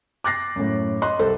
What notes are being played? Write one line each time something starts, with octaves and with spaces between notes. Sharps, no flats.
D6 F#6 A6 A#6 C7
F#2 A2
D#5 C6 F#6
C2 C3 A4 C5